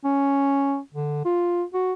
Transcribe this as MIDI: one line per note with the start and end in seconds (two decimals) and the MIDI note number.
0.04 0.79 61
0.94 1.24 50
1.25 1.63 65
1.74 1.93 66